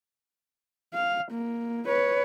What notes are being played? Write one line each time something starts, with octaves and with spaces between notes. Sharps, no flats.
F5
A#3
B4 C#5